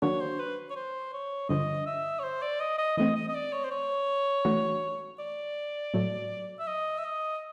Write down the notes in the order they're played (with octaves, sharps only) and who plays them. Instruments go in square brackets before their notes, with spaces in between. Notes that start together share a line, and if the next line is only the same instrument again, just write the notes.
[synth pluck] D#3 F#3 A#3 D4 F#4 [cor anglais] C#5
[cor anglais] C5
B4
C#5
C5
C#5
[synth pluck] G2 D3 F3 [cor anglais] D#5
[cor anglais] E5
C#5
C5
D5
D#5
D#5
[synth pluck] E3 A3 C4 [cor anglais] D#5
[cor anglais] D#5
D#5
D5
C#5
C5
C#5
[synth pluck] E3 A3 D4 F#4
[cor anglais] D5
[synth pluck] A2 F#3 A3
[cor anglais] E5
D#5
E5
D#5